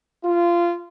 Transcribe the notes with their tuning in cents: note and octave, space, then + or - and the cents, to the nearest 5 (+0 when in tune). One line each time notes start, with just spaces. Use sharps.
F4 -20